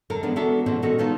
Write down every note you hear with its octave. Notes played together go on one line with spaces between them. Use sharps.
F#2 D3 A4 A#4
D3 E3 F3 G#3 B3 D4
B3 D4 F#4 A4 A#4 E5
B2 E3 F3 A#3 C4 C#4
A#2 D#3 F#4 A4 A#4 D#5
B3 C#4 D#4 F4 A4